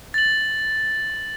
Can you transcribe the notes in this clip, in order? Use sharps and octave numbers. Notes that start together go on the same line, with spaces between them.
A6 F#7